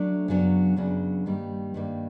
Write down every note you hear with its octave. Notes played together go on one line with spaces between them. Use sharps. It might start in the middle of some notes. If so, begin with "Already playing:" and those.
Already playing: F#3 A3 D4
F#2 C#3 F#3 B3 D4
F#2 C#3 F#3 B3 D4
G2 D#3 G3 A#3
G2 D#3 G3 A#3